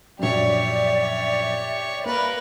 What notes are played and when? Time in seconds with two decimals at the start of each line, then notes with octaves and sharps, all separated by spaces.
0.19 A#1 F#2 G4 C#5 D5 E5
2.05 A#3 A#4 B4